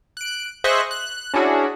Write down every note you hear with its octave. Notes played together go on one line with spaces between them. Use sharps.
F#6 D7
G#4 C5 D#5 E5 C#6 F#6
F#6
C#4 D4 E4 F#4 G#4